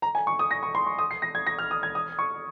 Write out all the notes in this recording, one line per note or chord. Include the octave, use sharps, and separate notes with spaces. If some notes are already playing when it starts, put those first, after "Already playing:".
A#5
G#5
C#6
D#6
A#6
C#6
C6
C#6
D#6
C7
A#6
G#6
A#6
F6
D#6
G#6
D#6
C#6